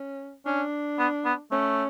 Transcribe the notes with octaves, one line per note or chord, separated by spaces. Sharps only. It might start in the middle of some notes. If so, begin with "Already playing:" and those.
Already playing: C#4
C#4 D4
B3
B3
A3 C#4